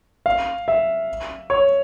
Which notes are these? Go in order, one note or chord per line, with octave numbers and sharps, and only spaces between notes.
F5
E5
C#5